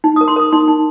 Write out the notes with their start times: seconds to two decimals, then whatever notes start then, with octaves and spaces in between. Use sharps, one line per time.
0.04 D#4
0.16 A#4 D#6
0.28 C6
0.36 A#4 D#6
0.52 D#4 C6
0.68 D#4